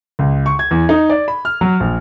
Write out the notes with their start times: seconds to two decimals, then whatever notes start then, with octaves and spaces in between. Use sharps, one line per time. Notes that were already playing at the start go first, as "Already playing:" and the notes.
0.19 C#2
0.46 C#6
0.59 G#6
0.71 E2
0.89 D#4
1.09 D5
1.28 B5
1.45 F6
1.61 F#3
1.80 A#1